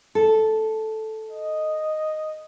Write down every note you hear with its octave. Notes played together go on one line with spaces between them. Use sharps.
A4
D#5